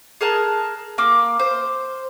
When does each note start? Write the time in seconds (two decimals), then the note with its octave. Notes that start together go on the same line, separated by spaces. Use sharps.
0.21 G#4 A#4 A5 F#6
0.98 A#3 D6
1.39 C5